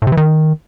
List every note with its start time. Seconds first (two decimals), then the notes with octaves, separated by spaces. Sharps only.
0.02 A2
0.07 C3
0.12 E3
0.17 D#3